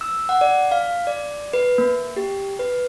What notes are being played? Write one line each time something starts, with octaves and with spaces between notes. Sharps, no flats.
E6
F#5
D5
F5
D5
B4
A#3
G4
B4